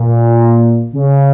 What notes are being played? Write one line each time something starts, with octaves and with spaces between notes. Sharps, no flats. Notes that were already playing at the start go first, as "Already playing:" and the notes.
Already playing: A#2
C#3